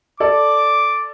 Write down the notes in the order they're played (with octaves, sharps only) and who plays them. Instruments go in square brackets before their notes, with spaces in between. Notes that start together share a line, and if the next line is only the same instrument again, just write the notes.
[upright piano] A4 D5 [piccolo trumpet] D6